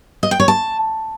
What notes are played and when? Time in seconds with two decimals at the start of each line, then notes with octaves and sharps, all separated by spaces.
0.23 D#5
0.31 G5
0.40 C#5
0.48 A5